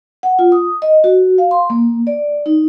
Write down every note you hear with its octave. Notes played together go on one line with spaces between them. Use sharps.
F#5
F4
D#6
D#5
F#4
F5
C6
A#3
D5
D#4